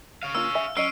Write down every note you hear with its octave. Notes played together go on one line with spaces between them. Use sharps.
C#5 F5
A#3 C#4 F4 E6
E5 G#5
F#3 C#4 D#5 E6 C7 D7